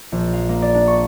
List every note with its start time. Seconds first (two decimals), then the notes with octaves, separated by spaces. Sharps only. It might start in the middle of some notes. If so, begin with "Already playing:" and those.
0.12 A#1
0.33 F5
0.49 A#3
0.62 D5
0.75 D4
0.87 C#6